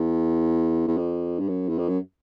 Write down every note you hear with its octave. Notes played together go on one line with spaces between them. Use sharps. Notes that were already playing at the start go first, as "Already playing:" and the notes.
Already playing: E2
E2
F2
G2
F#2
E2
F2
F#2